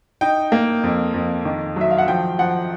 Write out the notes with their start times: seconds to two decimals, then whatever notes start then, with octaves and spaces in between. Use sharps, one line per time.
0.21 D#4 G5
0.52 A#3
0.84 F2
1.14 F2
1.45 D#3
1.76 F#3 E5
1.91 F5
1.98 F#5
2.08 F3 G5
2.39 F3 F#5